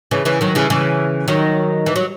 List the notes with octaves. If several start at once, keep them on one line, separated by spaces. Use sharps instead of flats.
C#3 E3
C#3 E3
D#3 F#3
C#3 E3
C#3 E3
D#3 F#3
E3
F#3